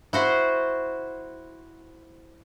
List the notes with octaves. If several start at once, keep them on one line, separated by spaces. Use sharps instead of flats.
E4 F#4 C5